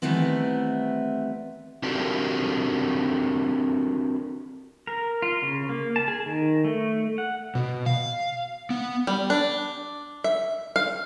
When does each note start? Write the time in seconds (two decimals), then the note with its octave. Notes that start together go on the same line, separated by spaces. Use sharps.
0.02 D#3 E3 G3 A3 B3 C4
1.83 C4 D4 F#4 G4 A4 A#4
4.87 A#4
5.22 F4
5.42 C#3
5.69 A#3
5.96 A5
6.08 G#4
6.26 D#3
6.65 A3
7.18 F#5
7.55 B2
7.86 F5
8.70 B3
9.07 G3
9.30 D4
10.24 E5
10.76 F5